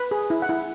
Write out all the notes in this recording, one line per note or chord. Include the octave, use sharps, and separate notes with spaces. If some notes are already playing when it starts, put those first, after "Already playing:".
Already playing: B4
G#4
E4
F#5
E4